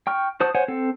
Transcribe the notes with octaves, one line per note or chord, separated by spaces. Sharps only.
G5 C#6 F6
F#4 C5 A5 D#6
C5 C#5 F#5 G#5
C4 A4